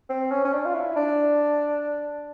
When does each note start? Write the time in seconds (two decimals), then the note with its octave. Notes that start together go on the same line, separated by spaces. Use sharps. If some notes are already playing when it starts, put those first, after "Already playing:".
0.10 C4
0.32 C#4
0.45 C#4
0.53 D4
0.65 F4
0.74 E4
0.96 D4